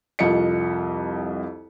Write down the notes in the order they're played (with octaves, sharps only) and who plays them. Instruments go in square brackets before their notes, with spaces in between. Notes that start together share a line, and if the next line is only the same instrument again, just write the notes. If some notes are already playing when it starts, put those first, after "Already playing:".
[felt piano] C2 F2 F4 D#5 C#7